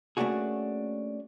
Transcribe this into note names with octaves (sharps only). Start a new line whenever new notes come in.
A3 A#3 C#4 D4 F#4 G#4